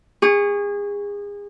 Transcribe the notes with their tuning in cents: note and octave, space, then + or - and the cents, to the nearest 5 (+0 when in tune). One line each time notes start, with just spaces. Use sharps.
G#4 -30 C#6 +0